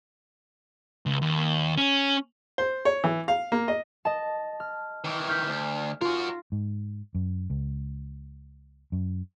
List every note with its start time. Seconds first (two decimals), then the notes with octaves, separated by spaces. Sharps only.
1.06 C#2
1.22 D#2
1.77 C#4
2.58 C5
2.85 C#5
3.04 E3
3.28 F5
3.52 A#3
3.68 D#5
4.05 D#5 A5
4.60 F6
5.04 D#3 E3
5.28 F6 G6 B6
5.47 D2
6.01 F4 F#4 A#4
6.52 G#2
7.15 F#2
7.50 C#2
8.92 F#2